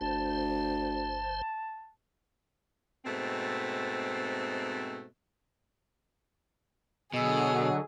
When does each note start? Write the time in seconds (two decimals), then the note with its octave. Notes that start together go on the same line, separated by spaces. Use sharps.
0.01 G1 D2 C5 A5
3.05 G#2 B2 A3 C4
7.14 B2 D3 F#3 G#4 D#5 E6